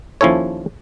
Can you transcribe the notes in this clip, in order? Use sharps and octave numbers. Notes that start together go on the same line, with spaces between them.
D#2 F3 C#4 E4 A4 C#5